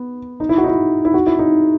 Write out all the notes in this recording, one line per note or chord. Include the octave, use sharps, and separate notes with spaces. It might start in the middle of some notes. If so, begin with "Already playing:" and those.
Already playing: B3
D#4
E4
F#4
D#4
E4
E4
F#4
E4
D#4